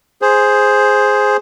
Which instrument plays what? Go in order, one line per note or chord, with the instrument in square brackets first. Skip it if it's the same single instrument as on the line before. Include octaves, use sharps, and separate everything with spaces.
[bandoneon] G#4 C5